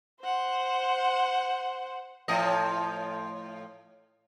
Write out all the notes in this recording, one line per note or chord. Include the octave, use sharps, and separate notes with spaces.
C5 F#5
A2 F3 D#5